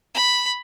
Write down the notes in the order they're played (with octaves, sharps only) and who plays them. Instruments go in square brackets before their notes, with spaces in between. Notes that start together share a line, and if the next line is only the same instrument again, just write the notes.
[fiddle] B5